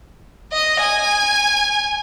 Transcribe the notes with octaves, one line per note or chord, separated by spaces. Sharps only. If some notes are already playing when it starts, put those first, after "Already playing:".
D#5
G#5